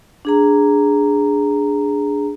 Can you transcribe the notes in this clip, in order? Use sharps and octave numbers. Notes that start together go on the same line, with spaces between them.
D4 G#4 A#5